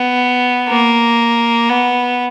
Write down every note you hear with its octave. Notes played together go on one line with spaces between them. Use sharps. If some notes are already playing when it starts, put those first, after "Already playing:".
Already playing: B3
A#3
B3